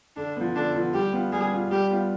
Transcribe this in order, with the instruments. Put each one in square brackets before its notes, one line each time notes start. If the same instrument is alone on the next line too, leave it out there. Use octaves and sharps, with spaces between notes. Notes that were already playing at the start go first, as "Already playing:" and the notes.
[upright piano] D3 [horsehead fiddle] D4
[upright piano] F3 B3
[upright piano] D3 [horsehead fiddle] D4
[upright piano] F3 B3
[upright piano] G3 [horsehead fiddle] G4
[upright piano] B3 F4
[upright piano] G3 [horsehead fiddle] G#4
[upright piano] B3 F4
[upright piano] G3 [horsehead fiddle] G4
[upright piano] B3 F4